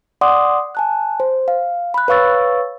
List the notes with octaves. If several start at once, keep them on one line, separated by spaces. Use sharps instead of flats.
D5 F#5 C6 D6 D#6
G#5 A5 F#6
C5
F5
B5 F#6
B4 C#5 F5 C#6 E6 A6